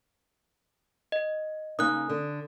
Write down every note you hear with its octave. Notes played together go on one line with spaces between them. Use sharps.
D#5
C#3 A#3 D#4 D#6 F#6
D3